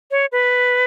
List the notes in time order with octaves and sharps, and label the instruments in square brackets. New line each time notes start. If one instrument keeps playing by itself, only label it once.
[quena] C#5
B4